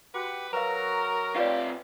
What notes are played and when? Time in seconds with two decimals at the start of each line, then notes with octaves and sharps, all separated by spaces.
0.14 F#4 G4 B4 F#5
0.53 F#3 F#4 A#4 B4 F5 A#5
1.36 C3 F4 G4 B4 C#5 D5